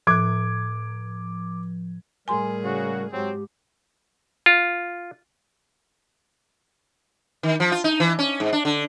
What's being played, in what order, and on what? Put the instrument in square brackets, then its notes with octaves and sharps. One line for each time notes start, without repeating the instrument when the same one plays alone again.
[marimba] A2 F#6 [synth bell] F3 [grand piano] D6 G#6
[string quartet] A2 G#4 [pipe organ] G3 A#4 [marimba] G#5 C6
[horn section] C#3 F#4
[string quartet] G#2 [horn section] F#3 C4 [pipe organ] G4
[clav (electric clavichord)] F4
[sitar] D#3
F3
F4
D#4
E3
C#4
G#2
D4
D3